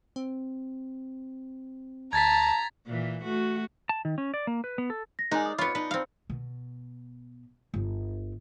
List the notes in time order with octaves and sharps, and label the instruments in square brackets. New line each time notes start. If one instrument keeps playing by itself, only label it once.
[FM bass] C4
[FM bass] D2 [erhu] A5 [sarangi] A#5 [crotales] G#6 A6 B6
[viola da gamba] A#2 E3
A3 F#4
[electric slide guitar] A5
D#3
C#4
D5
A#3
B4
B3
A4
[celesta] A#6
[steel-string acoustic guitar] G#3 A#4 D5 [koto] D#4 [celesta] G#5 F#6
[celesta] D#6
[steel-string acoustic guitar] F2 C#5 [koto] B3 F4 [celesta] B5 C#7
[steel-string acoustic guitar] D4 D#4 [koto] B4
[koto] C4 F5
[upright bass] B2
G1